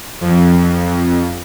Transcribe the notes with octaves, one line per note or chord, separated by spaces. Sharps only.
F2